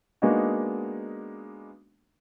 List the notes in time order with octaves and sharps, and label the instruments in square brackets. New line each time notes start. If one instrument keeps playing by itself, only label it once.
[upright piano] G#3 A#3 B3 D4 D#4 F#4